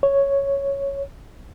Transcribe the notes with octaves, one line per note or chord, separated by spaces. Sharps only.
C#5